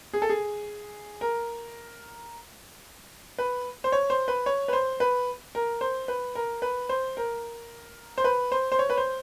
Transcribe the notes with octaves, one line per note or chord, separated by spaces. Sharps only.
G#4
A4
G#4
A#4
B4
C5
C#5
C5
B4
C#5
B4
C5
B4
A#4
C5
B4
A#4
B4
C5
A#4
C5
B4
C5
C5
C#5
B4
C5